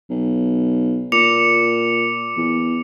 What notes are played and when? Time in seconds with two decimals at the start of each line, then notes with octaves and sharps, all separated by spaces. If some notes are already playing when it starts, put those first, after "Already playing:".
0.10 B1
1.12 A#2 D6 C#7 F7
2.36 E2